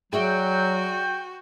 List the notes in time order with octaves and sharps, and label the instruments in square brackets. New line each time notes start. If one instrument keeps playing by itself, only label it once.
[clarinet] F#3 [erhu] F#4 [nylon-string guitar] G#4 D5 E5 [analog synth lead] G5